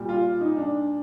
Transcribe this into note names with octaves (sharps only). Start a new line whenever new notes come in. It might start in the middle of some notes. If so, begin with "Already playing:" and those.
Already playing: A#2 G3
F4
D#4
D4